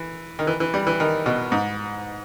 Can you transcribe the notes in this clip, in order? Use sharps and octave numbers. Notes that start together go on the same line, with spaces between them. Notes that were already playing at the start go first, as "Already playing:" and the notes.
Already playing: E3
D#3
E3
E3
G3
E3
D#3
B2
G#2